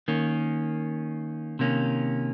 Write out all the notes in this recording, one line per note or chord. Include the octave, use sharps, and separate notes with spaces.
D#3 A#3 C#4
C3 D#3 A#3 C#4